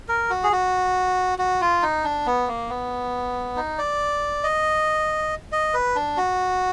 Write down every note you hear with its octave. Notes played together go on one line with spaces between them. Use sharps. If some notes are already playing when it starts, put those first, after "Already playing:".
A#4
F#4
G#4
F#4
F#4
F4
D#4
D4
B3
A#3
B3
D#4
D5
D#5
D#5
B4
D4
F#4